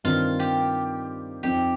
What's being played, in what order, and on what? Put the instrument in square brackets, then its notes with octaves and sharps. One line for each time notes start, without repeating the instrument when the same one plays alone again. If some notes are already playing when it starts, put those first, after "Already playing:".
[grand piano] G2 D#3 C4 D#4 [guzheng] F4
[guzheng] G4
[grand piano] F2 F3 C4 D#4 [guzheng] G4